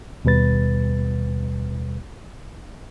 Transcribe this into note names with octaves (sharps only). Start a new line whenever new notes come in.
D#2 B2 G3 B4 A6